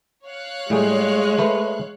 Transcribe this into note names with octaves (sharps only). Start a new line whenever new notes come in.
C#5 F5 F#6
A2 G3 G#3 G#4
A3 B4 C5